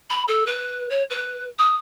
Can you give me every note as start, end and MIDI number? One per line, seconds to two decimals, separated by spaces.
0.09 0.22 83
0.27 0.43 69
0.46 0.87 71
0.90 1.02 73
1.10 1.44 71
1.58 1.76 87